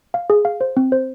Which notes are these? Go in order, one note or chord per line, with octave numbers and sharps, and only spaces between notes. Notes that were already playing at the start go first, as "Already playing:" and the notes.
F5
G#4
F5
C5
C4
C5